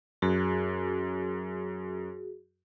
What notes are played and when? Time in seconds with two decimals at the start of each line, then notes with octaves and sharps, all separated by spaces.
0.22 F#2 F#4 G#4